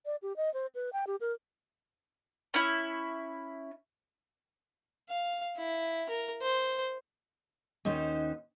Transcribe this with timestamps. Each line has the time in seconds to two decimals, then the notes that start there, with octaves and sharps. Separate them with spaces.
0.06 D5
0.22 G4
0.37 D#5
0.54 C5
0.75 B4
0.93 G5
1.07 G4
1.21 A#4
2.54 C#4 E4
5.09 F5
5.57 E4
6.10 A#4
6.42 C5
7.85 D#2 C#4 D#4 F#4 C5